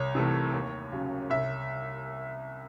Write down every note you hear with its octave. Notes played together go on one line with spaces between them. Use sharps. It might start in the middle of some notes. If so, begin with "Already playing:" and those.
Already playing: C2 C#5
C3 E3 A3
D#2
C#3 F#3 C#4
C2 E5